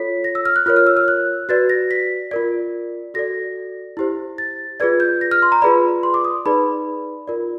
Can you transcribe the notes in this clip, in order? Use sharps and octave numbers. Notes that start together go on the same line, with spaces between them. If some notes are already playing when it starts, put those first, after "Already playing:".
Already playing: F4 A4 C#5 B6
A#6
E6
F6
F#6
F4 A#4 C#5 F6
F6
E6
F6
F#6
F#4 B4 D5 A6
A#6
B6
F4 A#4 D5
F#4 A4 D5 A#6
E4 G4 C5
A6
F4 G#4 B4 D5 G#6
G6
A#6
F6
C6
A#5
F4 G#4 B4 D5 B5
C6
D6
D#6
D#4 G#4 B4 D5 B5
F4 A#4 D5